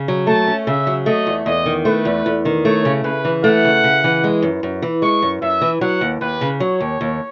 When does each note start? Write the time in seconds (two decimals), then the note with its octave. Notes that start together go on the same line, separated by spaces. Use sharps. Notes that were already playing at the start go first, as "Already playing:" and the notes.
Already playing: C#3
0.08 F#3
0.27 A3 A5
0.47 C#4
0.67 C#3 E5
0.87 F#3
1.06 A3 D#5
1.27 E2
1.46 E2 D#5
1.66 D#3
1.85 A3 B4
2.05 E2
2.26 E2
2.45 D#3
2.65 A3 C#5
2.85 C#3
3.04 C#3 B4
3.25 E3
3.44 A3 F#5
3.64 C#3
3.84 C#3
4.04 E3
4.24 G#3
4.42 F#2
4.63 F#2
4.82 E3
5.02 G#3 C#6
5.22 F#2
5.42 F#2 E5
5.61 E3
5.81 F#3 F#5
6.01 D#2
6.21 D#2 B4
6.41 C#3
6.60 F#3 C#5
6.80 D#2
7.01 D#2